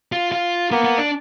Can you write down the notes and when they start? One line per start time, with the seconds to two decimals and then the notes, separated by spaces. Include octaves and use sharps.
0.12 F4
0.32 F4
0.71 A#3 B3
0.84 B3
0.98 D4